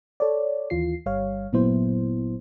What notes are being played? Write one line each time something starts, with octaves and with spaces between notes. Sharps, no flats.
A4 C#5 D5
D#2 E3 F4 C7
G1 G3 C#5 F5
G1 A#2 F#3 B3 E4 C5